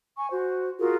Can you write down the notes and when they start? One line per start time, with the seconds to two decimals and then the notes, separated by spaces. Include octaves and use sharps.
0.17 G#5 C#6
0.30 F#4 C5
0.79 F4 F#4 G#4 A#4